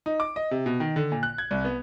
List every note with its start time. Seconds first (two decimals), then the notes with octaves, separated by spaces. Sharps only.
0.06 D#4
0.20 D6
0.36 D#5
0.51 C3
0.66 B2
0.80 D#3
0.96 D3
1.12 A#2
1.23 F#6
1.38 G#6
1.51 C2
1.65 B3